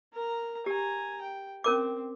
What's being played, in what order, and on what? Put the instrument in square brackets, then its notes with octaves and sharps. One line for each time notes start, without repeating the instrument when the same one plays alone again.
[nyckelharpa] A#4 A#5
[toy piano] G4 [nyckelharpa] G#5 A#5
[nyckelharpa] G5
[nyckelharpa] C4 [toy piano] C#4 A#4 D6